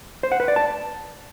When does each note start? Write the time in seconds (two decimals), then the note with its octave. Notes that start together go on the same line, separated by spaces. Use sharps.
0.23 C5
0.32 F#5
0.40 B4
0.48 D5
0.56 A5